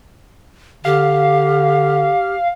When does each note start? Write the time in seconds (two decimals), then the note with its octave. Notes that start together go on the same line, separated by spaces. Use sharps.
0.85 D3 G4 F5